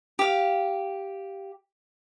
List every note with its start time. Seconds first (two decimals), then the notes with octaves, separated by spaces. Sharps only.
0.19 G4 F5